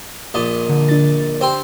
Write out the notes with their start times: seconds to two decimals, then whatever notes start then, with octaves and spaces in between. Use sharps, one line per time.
0.34 A#1 A#2 D#5
0.69 D3
0.88 D4 A6
1.41 C4 G4 C5 G5 C6